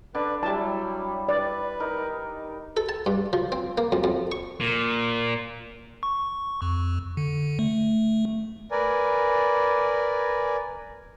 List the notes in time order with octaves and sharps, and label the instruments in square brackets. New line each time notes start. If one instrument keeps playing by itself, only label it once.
[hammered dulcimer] D3 D5 [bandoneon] B4
[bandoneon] F#3 [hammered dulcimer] G3 E4 [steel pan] A5
[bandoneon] B4 [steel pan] D5
[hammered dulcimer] D#4 A#4
[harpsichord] A4
A5
G2
F3
C4
A#3
F2
F2
C#6
[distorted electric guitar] A#2
[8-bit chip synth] C#6
F2
D3
A3
[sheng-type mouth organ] A#4 B4 D5 G#5